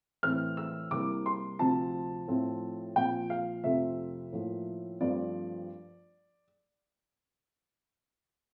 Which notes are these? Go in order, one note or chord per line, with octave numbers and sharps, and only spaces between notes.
A2 E3 A3 C4 F6
E6
C2 C3 G3 A#3 D6
C6
D2 C3 F3 C4 A5
A2 F3 A3 C4
A#2 F3 C4 G5
F5
F2 C3 F3 A3 C4 E5
A2 F3 A#3
G2 F3 A3 C4 D5